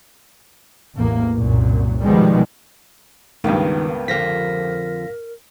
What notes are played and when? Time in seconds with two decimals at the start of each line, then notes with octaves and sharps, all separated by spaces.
0.97 A1 E2 A#3
1.36 C2 F#2 A#2
2.03 B2 D#3 F3 G3 G#3 B3
3.44 C#2 G2 D#3 A#3 B3
4.08 F2 D3 F3 A#4 F5 A#6 B6